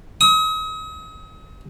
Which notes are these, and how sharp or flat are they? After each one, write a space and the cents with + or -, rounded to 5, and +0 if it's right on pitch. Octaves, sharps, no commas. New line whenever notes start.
D#6 +40